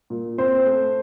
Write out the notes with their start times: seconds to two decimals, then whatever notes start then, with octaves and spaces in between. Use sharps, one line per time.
0.10 A#2
0.38 C4 C5
0.66 A3